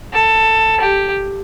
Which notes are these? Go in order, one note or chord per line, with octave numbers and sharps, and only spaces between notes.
A4
G4